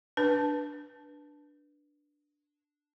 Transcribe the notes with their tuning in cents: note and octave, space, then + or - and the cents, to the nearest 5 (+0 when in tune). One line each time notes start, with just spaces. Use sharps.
D4 +0 B4 -15